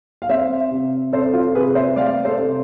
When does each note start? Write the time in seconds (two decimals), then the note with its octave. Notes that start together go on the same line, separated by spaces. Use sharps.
0.22 F5
0.29 C4 C5 E5
0.71 C3
1.13 C4 A4 C5
1.33 F4 A4
1.55 C3 G#4 B4
1.75 C5 E5
1.96 A3 D5 F5
2.25 A4 C5
2.39 C3